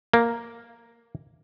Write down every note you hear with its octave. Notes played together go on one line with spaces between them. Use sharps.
A#3